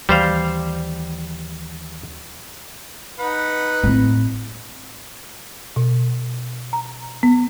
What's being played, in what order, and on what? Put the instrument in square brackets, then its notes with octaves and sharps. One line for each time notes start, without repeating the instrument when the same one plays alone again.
[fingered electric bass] D#2 E3 [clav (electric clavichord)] G3 C5 F5
[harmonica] D#4 B4 F#5
[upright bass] A2 C4
[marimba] B2
A#5
B3